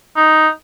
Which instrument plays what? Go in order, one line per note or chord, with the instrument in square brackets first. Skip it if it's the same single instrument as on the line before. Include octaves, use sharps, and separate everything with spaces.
[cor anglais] D#4